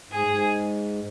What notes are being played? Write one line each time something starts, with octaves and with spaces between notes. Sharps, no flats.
G#2 G#4
G#2